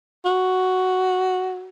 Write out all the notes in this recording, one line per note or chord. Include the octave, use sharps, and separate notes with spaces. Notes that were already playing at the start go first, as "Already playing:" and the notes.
F#4